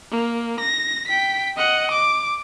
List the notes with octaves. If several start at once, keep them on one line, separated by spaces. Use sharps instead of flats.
A#3
A#6
G5 B6
D#5 F#5
D6